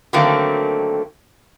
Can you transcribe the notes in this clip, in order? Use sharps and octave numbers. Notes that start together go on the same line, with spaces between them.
D3 D#3 F#3 A3 A#3 C4